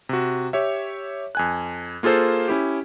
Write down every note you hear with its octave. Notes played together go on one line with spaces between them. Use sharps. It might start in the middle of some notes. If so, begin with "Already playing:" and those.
C3 F#4
G4 C#5 E5
F2 G#5 F#6
A#3 F4 G#4 A4 C5
C#4 E4 G4